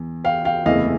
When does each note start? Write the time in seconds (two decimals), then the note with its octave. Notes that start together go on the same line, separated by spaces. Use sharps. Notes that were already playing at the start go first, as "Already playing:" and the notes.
Already playing: E2
0.24 F5 G5
0.45 F5 G5
0.66 F#1 E2 C3 E3 A3 D#5 F5